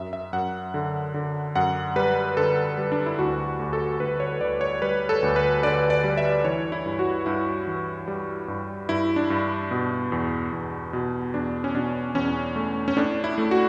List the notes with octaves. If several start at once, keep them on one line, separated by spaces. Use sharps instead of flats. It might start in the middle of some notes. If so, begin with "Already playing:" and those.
Already playing: F#2 E5
E5
F#2 F#5
D3
D3
F#2 F#5
G3 B4
D3 A4
G3
D4
E4
D2 F#4
D2
A4
D2 B4
C#5
D2 D5
C#5
G3 B4
A4
D2
B4
D3 D5
D5
G3
E5
E3 C#5
E4
G2
F#4
G2 E4
E3
G3
G2
G2 E4
D4
G2
B2
E2
E2
B2
E2 D4
C#4
B2 D4
E2 C#4
A3
C#4
A2 D4
E4
A3
F#4